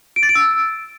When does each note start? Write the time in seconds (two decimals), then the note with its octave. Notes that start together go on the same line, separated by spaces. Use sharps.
0.16 D7
0.23 A6
0.29 D7
0.35 E6